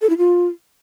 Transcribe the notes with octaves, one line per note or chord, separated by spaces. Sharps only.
A4
E4
F4